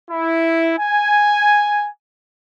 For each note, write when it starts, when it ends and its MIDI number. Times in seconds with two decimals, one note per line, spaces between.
0.11 0.75 64
0.79 1.89 80